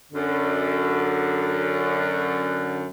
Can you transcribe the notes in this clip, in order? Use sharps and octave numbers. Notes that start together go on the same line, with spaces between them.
F#2 D3